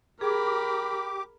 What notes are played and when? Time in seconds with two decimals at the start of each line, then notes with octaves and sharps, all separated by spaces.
0.21 G4 G#4 A#4 B5 D6